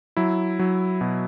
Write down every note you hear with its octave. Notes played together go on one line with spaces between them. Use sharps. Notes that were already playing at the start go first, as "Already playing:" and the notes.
F#3 E4
F#3
B2